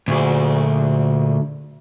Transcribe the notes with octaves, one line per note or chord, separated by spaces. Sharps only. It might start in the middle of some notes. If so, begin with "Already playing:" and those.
D2 A#2 G#4